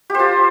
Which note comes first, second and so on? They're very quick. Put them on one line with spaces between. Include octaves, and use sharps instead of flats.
G4 C5 F4